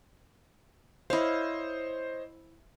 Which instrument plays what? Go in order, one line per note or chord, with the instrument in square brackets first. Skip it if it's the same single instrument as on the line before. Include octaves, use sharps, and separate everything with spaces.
[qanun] E4 F5 [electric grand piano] C5 C#5 D#5